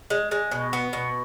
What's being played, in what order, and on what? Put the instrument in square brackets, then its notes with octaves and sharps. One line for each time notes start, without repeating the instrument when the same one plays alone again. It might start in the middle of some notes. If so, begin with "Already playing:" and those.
[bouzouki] G#3
G#3
B2
B3
B2